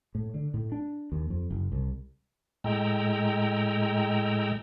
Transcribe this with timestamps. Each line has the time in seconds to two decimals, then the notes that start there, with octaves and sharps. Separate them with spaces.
0.15 A2
0.34 D3
0.54 A2
0.72 D4
1.12 D#2
1.30 F2
1.51 F#1
1.72 C2
2.64 A2 G#3 G5 A#5 E6